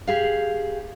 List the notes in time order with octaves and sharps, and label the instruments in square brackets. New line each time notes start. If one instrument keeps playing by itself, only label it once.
[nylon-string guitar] G4 G#4 F5